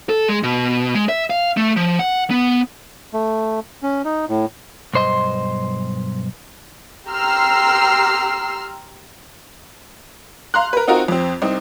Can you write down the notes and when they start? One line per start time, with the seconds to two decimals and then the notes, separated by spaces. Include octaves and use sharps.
0.09 A4
0.29 G#3
0.43 B2
0.94 G#3
1.09 E5
1.30 F5
1.57 A3
1.76 F3
1.99 F#5
2.30 B3
3.13 A3
3.83 C#4
4.05 D#4
4.29 A2
4.94 B1 G2 C5 D#5 C6
7.07 G4 A#5 C6 E6 F6 C7
10.54 F5 A#5 C6 F#6
10.73 A#4 B4
10.88 C4 D#4 F4 F#4 A#4
11.08 F2 C4
11.42 C2 C4 D#4